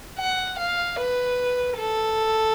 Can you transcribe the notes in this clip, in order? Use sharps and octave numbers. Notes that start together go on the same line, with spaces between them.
F#5
F5
B4
A4